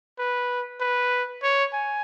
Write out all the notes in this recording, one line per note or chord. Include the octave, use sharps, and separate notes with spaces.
B4
B4
C#5
G#5